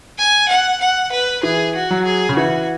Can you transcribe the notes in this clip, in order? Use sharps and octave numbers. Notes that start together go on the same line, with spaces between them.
G#5
F#5
F#5
B4
E3 G#4
F#4
F#3
G#4
C#3
E3 F#4